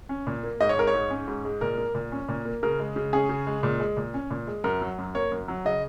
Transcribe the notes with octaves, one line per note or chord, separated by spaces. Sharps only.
C#4
A#2
A#3
G#2 D#5
C#5
G#3 A#4
C#5
G#2
C#4
G#2
G#3
A#2 A#4
A#3
A#2
C#4
A#2
A#3
C#3 A#4
G#3
C#3
C#4 G#4
C#3
G#3
A#2
G#3
A#2
C#4
A#2
G#3
F#2 A#4
F#3
F#2
A#3 C#5
F#2
F#3
C#3 D#5